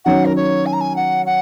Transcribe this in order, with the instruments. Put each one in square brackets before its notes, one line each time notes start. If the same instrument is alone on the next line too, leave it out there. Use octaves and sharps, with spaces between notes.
[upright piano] D#3 F#3 C#4 [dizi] F#5
[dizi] A#4
C#5
G#5
A#5
G#5
F#5
F#5